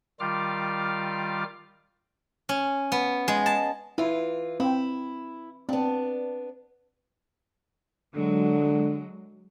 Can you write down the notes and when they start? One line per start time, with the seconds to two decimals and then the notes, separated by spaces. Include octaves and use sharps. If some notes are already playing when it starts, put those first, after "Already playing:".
0.20 D#3 G3 F4 D6 F6
2.49 C#4
2.92 B3
3.28 G#3
3.46 A5
3.98 E3 E4 F4
4.60 C4 E4
5.69 B3 C4 D4
8.16 D3 F#3 G#3